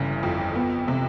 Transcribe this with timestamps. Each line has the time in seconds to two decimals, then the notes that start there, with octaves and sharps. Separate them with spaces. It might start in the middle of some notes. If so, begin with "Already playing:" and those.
Already playing: G1 C#3 E3
0.23 F2
0.56 B3
0.88 C3